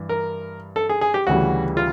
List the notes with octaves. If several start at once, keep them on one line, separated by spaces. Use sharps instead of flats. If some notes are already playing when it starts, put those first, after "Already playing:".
Already playing: G2 E3
A#4
A4
G#4
G#4
G4
D2 C#3 E3 G3 F#4
F4